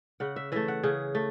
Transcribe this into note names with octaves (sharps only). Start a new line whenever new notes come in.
C#3 F#5
E5
E3 A3 E5
F#5
C#3 G#4
A3